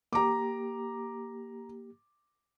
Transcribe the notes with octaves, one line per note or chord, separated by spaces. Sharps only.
A#3 G4 A#5 D6